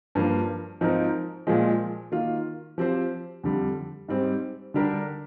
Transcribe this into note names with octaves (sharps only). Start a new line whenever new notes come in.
G2 F3 A#3
G#2 F3 C4 D#4 A#4
A#2 F3 G#3
D#3 A#3 F4
F3 C4 G4 C5
F2 D3 G3
G#2 G3 C4
D3 G3 D4 G4 A#4